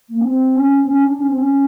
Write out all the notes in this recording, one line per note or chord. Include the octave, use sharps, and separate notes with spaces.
A#3
C#4
C4
C#4
C4
C#4
D4
C#4
C4
C#4